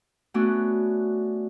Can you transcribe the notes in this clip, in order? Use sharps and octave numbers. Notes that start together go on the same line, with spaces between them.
A3 B3 C#4 D4 F#4